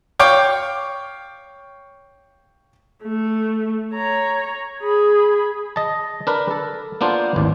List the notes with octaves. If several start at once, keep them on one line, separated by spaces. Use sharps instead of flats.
C#5 F5 G5 C#6 D6
A3
C#5 A#5
G#4 B5
D#5 A5
D4 A#4 B4
A4
A#3 B3 D4 F4 C5
G#1 D#2 A2